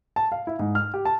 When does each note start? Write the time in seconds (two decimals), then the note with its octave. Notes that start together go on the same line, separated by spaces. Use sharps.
0.16 A5
0.32 F5
0.47 E4
0.59 G#2
0.75 F6
0.94 G4
1.05 A5